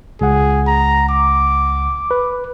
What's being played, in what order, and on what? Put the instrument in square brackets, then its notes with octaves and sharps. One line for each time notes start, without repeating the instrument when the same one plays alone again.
[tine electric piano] C#2 F#5 [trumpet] G#4
[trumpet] A#5
D6
[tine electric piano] B4